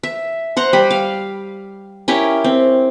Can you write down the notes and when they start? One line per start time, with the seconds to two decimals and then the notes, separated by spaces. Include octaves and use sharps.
0.03 E5
0.57 C5 F#5 A#5
0.73 G3 B5
0.91 F5
2.08 C#4 E4 G4 A#4
2.44 C4